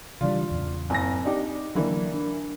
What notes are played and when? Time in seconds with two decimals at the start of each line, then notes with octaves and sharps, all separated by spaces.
0.21 C#3 E3 G3 D4 F4
0.51 E2 A2 C#3
0.90 F#1 C4 G#5 A#6
1.24 D4 D#4 G4
1.75 D3 E3 F#3 A#3
2.14 D4